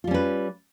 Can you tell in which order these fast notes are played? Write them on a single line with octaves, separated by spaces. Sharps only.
F4 G3 C#4 B4